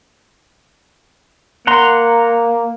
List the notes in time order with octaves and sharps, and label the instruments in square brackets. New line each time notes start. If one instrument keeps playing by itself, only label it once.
[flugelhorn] A#3 [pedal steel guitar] F#5 A#5 C6